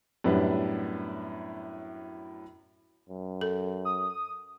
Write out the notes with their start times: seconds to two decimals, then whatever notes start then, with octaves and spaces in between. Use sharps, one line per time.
0.24 F#2 A2 G3 B3 D4
3.09 F#2
3.41 A4
3.85 D#6